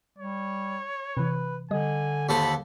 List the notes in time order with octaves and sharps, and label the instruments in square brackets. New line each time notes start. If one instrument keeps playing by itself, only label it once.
[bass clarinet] G3 [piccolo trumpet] C#5
[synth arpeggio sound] C3 E3 [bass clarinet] B4
[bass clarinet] D3 [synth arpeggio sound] G3 D#5 [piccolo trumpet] G#5
[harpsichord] D#2 A4 C5 [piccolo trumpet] B5